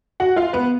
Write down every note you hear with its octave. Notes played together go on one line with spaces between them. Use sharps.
F#4 F#5
F4 F5
B3 B4